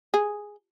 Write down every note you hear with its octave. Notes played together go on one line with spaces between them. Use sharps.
G#4